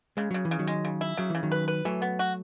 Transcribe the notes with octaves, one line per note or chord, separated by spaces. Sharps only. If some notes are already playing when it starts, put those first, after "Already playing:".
C#3 G#3
C#3 F#3
E3
C#3
D#3 F#3
G#3
C#3
E4
C#3 F#3
C#3 E3
D#3 F#3
B4
B4
E3 F#3 A3
B3
F#4